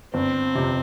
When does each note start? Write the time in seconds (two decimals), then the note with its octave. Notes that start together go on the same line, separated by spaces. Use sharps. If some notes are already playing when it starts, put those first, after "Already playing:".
0.14 G1 C4
0.55 F2 C3